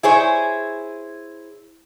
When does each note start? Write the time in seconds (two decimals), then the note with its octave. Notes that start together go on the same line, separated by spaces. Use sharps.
0.03 E4 G#4 C5 C#5